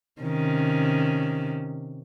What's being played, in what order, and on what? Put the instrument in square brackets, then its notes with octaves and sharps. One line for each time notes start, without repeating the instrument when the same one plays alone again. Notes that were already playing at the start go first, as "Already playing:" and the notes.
[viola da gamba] C3 D#3 C#4